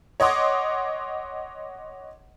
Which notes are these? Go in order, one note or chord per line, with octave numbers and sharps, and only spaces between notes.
C#5 D#5 F#5 C6 D6